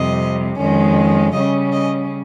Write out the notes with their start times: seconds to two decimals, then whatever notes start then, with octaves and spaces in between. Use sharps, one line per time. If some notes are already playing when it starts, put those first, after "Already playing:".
Already playing: F2 C3 G3 D#5
0.57 F2 D#3 G#3 C#4
1.33 C#3 G3 C#4 D#5
1.72 D#5